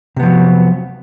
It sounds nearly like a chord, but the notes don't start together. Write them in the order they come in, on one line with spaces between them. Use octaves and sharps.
C3 B3 F3 F#3